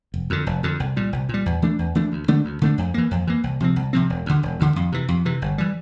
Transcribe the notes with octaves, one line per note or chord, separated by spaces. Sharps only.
F1
F2 D3
F1
F2 D3
C2
A#2 G3
C2
A#2 G3
E2
E3 A3 D4
E2
E3 A3 D4
D2
D3 A3 D4
D2
D3 A3 D4
F2
E3 A#3
F2
E3 A#3
C2
C3 F3 C4
C2
C3 F3 C4
E1
D2 D3
E1
D2 D3
F2
C3 E3
F2
C3 E3
G1
E3 G3